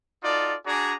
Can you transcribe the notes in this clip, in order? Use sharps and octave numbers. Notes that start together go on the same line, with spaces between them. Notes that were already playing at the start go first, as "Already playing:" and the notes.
D#4 F4 F#4 A4 D5
D4 F#4 G#4 D5 G#5 A#5